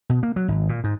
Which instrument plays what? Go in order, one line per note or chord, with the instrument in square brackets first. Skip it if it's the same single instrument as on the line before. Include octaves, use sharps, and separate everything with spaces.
[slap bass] B2
A#3
F#3
G#1
A#2
G#2